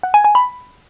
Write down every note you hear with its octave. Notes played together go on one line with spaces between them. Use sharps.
F#5
G#5
G#5
B5